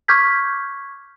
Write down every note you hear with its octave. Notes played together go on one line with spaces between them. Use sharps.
C#6 D6 F6 G6 G#6 B6